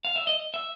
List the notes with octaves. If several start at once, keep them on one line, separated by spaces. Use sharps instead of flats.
F5
E5
D#5
E5